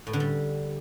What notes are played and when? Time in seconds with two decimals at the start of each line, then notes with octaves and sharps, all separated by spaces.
0.07 A2
0.13 D3
0.20 G3